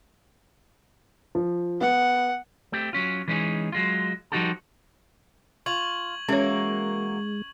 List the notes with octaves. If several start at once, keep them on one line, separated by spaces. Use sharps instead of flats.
F3
B3 F#5
A3 C4 G4
F#3 C#4 F4
E3 G#3 C#4 D#4 G#4
F#3 G#3 F4
F3 G3 D#4 F#4 G4 A4
F4 C#6 G#6 F#7
E3 G#3 A#3 C#4 F#4 C#5